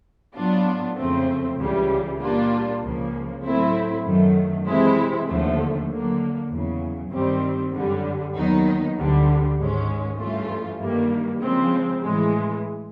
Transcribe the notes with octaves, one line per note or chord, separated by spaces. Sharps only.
A2 F#3 B3 D4 F4
F2 C#3 F3 A3 C4
C#2 C#3 E3 G3
A#2 G3 A#3 D4 F4
C#2 C#3 F3 A#3
A2 F#3 A3 C4 E4
F#2 D#3 F#3 A3
C3 E3 G#3 C4 E4
D#2 D3 F3 A3
D3 F#3 A#3
E2 C#3 F#3
G2 D#3 G3 C4
F#2 D3 G3
D#2 D#3 F#3 B3 D#4
D2 D3 G3
G#2 D#3 G#3 C#4
G2 E3 A3 C#4 F4
G2 D#3 G3 A#3
C#3 F3 G#3 C4
A2 E3 G#3